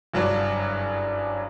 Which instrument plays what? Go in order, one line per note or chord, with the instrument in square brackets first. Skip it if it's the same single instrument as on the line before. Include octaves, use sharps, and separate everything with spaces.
[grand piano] F#1 G2 F#3 D4